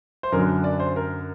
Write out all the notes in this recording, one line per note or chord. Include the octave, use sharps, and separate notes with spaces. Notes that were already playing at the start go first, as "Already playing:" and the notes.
C5
F#2 D3 F#3 A#4
D5
C5
A#4